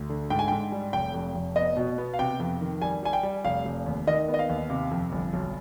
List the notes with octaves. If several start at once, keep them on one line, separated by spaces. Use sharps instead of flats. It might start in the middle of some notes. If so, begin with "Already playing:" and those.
Already playing: D2
D3
G#2 G5
G#5
G#2 G5
G3
F1 G5
F2
F1
B3 D#5
B2
B3
F5
C3 G5
F2
D#3
G3 G#5
G3 G#5
G5
G3
F1 F5
F1
D#2
D#3 D#5
B3
D#5
F5
D#2
C3
F2
G1
B1